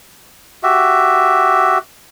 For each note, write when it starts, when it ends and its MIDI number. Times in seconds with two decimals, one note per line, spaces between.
0.63 1.78 66
0.63 1.78 67
0.63 1.78 76